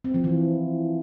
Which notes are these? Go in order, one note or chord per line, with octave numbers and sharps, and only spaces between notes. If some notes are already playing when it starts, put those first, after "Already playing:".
C4
F3
E3